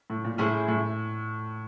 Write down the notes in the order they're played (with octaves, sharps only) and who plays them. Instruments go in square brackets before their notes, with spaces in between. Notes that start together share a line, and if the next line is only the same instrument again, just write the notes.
[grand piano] A2
A#2
[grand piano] A2 [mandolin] C#4 E4 G#4 C5
[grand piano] A2